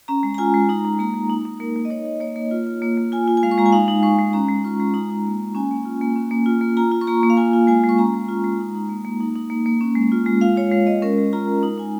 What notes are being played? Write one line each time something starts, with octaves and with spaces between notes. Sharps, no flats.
C#4 A#5
G#3
A#5
F4 G#5
G#3
D#4 A#5
D#4
A#3 A#5
A#3
D#4
D#4
A#3 A#4
A#3
D#5
D#4 C#5
D#4
A#3 C#5
A#3
F4
F4
A#3
A#3
F4 G#5
F4
G#5
G#3 F5
C#6
G#3 A#5
G#5
D#4 F5
D#4
G#3 C#6
G#3
C#4 A#5
G#3
F4 C#6
G#3
D#4 A#5
D#4
A#3
A#3
C#4 G#5
A#3
F4
A#3
C#4
A#3
F4
A#3
F4 A#5
F4
C#6
A#3 A#5
A#3
F5
F4 G#5
F4
G#3 G#5
G#3
C#6
C#4 A#5
G#3
F4
G#3
D#4
D#4
A#3
A#3
D#4
D#4
A#3
A#3
C#4
G#3
F4
G#3
F4 F5
F4 C#5
G#3 F5
G#3 D#5
C#4 A#4
G#3
F4 A#5
G#3
D#4
D#4 G#5